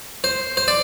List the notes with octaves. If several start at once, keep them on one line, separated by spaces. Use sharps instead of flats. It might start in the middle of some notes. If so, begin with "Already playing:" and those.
C5
C5
D5